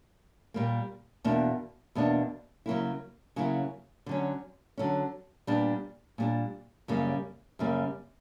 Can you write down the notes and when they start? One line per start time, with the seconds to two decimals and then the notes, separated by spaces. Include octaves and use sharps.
0.54 A#2 G3 A#3
1.24 E2 B2 A#3 D4
1.95 E2 B2 A#3 D4
2.66 C#3 F#3 A#3 E4
3.36 C#3 F#3 A#3 E4
4.06 D3 F#3 C#4
4.78 D3 F#3 C#4
5.47 A#2 G3 B3 D4
6.18 A#2 G3 B3 D4
6.88 F#2 C#3 G3 A#3
7.59 F#2 C#3 G3 A#3